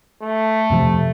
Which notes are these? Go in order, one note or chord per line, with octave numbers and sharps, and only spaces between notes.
A3
F2 C3 F3